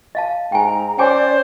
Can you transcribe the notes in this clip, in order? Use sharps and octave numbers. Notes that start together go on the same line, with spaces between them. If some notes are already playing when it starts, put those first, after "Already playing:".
D#5 F5 A5
G#2 G5 G#5 A#5
C#4 C5 D5 G5 G#5 D6